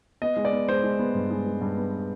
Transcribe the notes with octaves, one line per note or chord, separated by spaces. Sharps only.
B3 D#5
G#3
D5
B3
G#3 C5
G#3
B3
G2
G#3
G#3
G2
B3